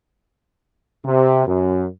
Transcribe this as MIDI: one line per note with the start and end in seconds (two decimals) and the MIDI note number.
1.05 1.45 48
1.47 1.86 42